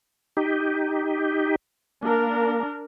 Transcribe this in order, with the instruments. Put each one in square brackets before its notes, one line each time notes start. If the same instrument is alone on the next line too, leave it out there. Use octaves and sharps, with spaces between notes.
[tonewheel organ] D#4 G4
[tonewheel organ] A#3 [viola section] D4 A#4